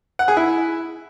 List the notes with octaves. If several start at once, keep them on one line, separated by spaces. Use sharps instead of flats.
F#5
G#4
E4